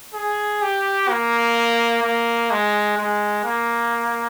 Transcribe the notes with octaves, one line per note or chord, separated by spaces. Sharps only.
G#4
G4
A#3
A#3
G#3
G#3
A#3